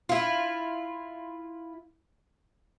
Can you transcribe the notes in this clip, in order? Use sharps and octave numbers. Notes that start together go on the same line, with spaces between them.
E4 F4